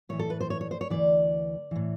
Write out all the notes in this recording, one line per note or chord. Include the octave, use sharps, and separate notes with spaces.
A2 E3 C#5
A4
B4
C5
C#5
C#5
C5
C#5
D2 C#3 E3 D5
A2 E3